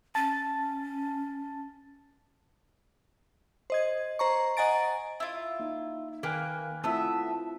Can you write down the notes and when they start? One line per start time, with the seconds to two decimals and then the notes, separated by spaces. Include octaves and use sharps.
0.15 C#4 A5 A6
3.70 C5 D#5 G#6
4.19 C5 A#5 C#6
4.57 D#5 F#5 G#5 A#5 A6 D7
5.20 E4 F4
5.60 A#3 D#4
6.23 D#3 A#3 B4 G5 G#5 F#6
6.84 A3 B3 C4 E4 F4 E5